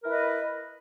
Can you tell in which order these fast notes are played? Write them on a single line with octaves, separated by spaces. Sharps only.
A#4 E4 B4 D#5